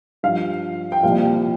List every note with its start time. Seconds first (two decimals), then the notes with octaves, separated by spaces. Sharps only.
0.23 G2 F3 F5
0.92 G5
1.03 C2 A#2 F3 F5